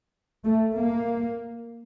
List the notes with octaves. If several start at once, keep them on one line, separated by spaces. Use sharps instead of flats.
A3
A#3